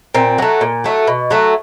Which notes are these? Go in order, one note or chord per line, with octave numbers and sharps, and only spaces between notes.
A#2 C4
F#3 A3
A#2
F#3 A3
B2
F#3 A3